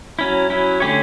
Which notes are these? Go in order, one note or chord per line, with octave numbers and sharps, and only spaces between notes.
F#3 C#4 E4
F#3 C#4 E4
D3 A3 C#4 G4 C#5